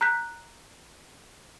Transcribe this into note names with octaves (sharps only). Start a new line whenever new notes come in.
A#5 F#6 G6 B6